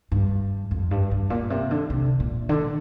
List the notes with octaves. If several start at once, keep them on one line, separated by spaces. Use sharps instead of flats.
G2
F2
G2
G2
A#2
C3
D3
C3
A#2
D3